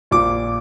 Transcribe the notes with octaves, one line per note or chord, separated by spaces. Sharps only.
A#1 A#2 D6